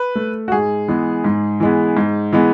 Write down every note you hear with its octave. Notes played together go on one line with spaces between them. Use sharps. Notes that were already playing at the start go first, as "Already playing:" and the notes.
Already playing: B4
A3
F#4
G#2 G#4
E3 G#3 B3
G#2
E3 G#3 B3
G#2
E3 G#3 B3